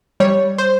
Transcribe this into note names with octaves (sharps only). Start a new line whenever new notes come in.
G3 C#5
C5